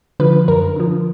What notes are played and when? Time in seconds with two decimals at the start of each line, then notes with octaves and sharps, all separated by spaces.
0.20 D3 F3 B4
0.48 F#2 A#4
0.76 D3 F3